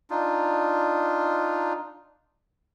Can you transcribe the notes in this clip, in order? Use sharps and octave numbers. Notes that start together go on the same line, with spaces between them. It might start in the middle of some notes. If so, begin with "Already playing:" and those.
D4 D#4 F4